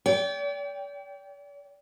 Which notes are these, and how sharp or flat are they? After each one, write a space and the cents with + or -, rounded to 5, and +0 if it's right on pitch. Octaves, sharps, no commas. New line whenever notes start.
D5 -45 G5 +0